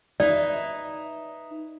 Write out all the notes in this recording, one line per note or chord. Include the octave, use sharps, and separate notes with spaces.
D#4 B4 D5 E5